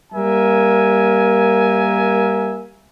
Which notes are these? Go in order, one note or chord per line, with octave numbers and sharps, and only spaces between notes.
G3 A#3 A#4 E5 G#5